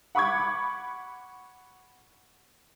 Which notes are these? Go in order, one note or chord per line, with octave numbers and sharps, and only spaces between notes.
F#5 B5 C#6 D6 G#6